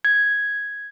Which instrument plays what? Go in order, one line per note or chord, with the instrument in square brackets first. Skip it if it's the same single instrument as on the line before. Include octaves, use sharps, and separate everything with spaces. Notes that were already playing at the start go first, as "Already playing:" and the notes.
[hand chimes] G#6